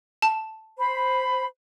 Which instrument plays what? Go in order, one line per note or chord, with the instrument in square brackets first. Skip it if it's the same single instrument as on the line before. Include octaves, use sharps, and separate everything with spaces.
[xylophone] A5
[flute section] C5 B5